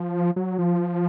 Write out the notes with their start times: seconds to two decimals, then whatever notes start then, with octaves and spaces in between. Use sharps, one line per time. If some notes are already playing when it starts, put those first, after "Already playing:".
Already playing: F3
0.36 F#3
0.59 F3